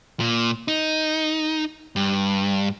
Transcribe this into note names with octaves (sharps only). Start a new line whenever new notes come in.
A#2
D#4
G2